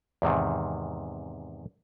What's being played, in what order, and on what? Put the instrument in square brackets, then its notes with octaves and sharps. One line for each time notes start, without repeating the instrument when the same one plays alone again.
[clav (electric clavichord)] E2 G#2 C3 D#3